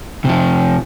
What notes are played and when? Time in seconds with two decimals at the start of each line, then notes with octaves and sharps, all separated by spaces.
0.25 C3 F3